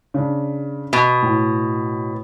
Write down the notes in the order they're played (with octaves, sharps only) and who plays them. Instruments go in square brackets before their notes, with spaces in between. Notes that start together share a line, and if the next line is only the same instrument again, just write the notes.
[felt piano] C#3 D4
[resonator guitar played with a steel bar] B2
[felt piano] A2